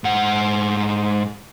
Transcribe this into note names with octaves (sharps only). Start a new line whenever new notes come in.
G#2 F#5